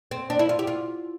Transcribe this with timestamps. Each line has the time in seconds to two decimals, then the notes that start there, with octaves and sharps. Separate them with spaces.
0.11 C4
0.30 D4
0.39 E4
0.49 F4
0.59 G4
0.67 F4